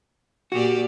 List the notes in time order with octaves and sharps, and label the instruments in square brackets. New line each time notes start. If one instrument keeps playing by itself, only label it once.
[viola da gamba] A#2 G4 D5 [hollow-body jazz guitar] F#4